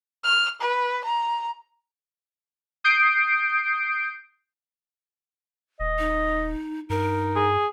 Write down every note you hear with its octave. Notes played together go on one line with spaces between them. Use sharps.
F6
B4
A#5
D#6 G6 C7 D7
D#1 D#5
D#4
G2 D#4 A#4
G#4